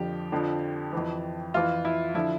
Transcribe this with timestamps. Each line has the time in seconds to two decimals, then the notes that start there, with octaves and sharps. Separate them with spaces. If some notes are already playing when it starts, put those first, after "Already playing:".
Already playing: F2 D3 F3 G4
0.32 F2 D3 F3
0.93 F2 E3
1.54 F2 E3 F4
1.85 E4
2.14 D3 F3 E4